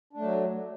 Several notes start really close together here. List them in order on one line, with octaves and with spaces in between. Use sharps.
D4 A3 F#3